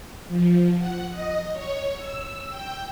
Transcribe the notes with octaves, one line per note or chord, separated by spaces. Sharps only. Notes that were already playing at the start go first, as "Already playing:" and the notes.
F3
F#5
D#5
C#5
E6
G5